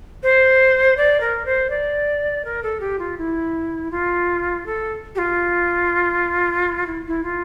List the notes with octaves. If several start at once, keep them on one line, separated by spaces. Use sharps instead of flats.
C5
D5
A#4
C5
D5
A#4
A4
G4
F4
E4
F4
A4
G4
F4
E4
E4
F4